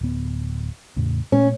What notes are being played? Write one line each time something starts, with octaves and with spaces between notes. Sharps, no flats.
D1 B3
E2 A2 C#3
A#2 G#3 A3 C#4